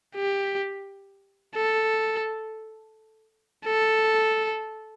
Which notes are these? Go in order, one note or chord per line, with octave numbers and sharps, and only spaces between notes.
G4
A4
A4